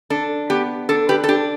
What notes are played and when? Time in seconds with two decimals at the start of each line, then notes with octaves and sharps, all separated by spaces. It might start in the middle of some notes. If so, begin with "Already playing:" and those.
0.10 D4 A4
0.50 B3 G4
0.89 D4 A4
1.09 G4 B4
1.24 A4
1.29 D4 G4